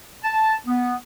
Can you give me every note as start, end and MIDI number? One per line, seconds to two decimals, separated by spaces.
0.24 0.55 81
0.67 0.96 59